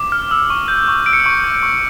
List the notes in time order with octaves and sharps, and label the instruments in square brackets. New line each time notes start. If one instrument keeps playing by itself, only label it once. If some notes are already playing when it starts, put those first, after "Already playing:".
Already playing: [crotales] D6
F6
E6
C#6
G6
C#6
E6 D7
C#7
D7
C#6
G6
C#6